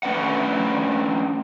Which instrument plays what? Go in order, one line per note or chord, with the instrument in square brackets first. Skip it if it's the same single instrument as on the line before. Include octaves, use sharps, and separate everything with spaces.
[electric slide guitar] A3 C#4 D4 B4 D5 F#5